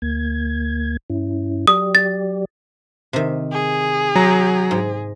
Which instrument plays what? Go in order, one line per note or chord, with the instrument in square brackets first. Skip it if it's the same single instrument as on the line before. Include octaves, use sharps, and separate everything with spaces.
[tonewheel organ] D2 A#3 G#6
G2 C#4 E4
[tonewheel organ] F#3 G4 D5 [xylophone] D#6
[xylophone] A6
[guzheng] C3 D#3
[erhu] G#4
[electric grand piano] F#3 A#5 A#6
[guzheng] G#2